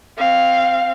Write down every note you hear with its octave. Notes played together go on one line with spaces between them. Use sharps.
C4 F5